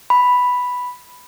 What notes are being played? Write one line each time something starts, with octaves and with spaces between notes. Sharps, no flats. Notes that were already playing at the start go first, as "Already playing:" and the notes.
B5